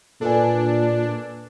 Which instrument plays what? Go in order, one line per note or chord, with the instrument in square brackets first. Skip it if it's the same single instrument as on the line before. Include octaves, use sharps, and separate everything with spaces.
[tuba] A#2 [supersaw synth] D4 [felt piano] A4 B4 G#5